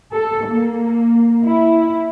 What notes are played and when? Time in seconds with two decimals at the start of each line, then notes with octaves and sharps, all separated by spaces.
0.14 A4
0.47 A#3
1.44 E4